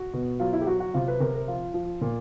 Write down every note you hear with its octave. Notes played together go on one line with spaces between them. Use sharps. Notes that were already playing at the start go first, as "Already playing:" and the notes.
Already playing: F#4
B2
F#3 F4
E4
G4
F#3 F#4
F#4
C3 F4
B4
C3 A#4
A#4
F3 F4
F3
A#2